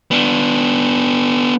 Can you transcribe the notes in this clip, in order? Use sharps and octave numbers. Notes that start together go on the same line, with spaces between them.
B3 D4